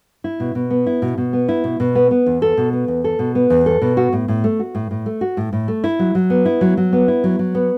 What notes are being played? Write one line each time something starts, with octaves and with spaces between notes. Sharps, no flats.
E4
B2
B2
B3
E4
B2
B2
B3
E4
B2
B2
B3
B3
E2
A4
B2
B3
E2
A4
B2
B3
E2
A4
B2
F#4
A2
A2
A3
F#4
A2
A2
A3
F#4
A2
A2
A3
E4
F#3
F#3
B3
E4
F#3
F#3
B3
E4
F#3
F#3
B3